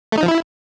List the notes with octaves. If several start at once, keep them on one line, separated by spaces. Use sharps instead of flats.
A3
D#4
F3
E4